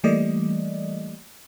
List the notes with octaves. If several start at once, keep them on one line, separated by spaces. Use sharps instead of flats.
E3 G3 A3 A#3 D5 D#5